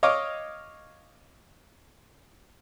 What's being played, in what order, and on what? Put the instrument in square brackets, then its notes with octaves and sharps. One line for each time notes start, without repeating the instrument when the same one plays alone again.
[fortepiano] C#5 D#5 F5 D6 D#6